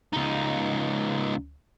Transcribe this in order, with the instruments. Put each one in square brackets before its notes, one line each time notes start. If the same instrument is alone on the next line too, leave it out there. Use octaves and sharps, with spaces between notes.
[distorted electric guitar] C#2 D#4